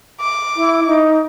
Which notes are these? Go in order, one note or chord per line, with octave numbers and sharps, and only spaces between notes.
D6
E4
D#4